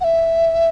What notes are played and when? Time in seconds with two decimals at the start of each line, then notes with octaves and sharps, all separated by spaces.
0.01 F#5
0.04 E5